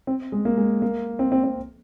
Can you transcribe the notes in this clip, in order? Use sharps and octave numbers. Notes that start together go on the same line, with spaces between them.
C4
G#3
A#3
G#3
A#3
C4
C4
C4